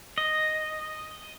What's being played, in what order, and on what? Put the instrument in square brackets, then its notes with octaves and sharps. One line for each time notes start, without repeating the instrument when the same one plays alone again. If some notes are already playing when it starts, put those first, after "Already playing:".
[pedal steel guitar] D#5